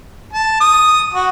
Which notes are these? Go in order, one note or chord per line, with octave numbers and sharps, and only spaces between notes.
A5
D#6
F#4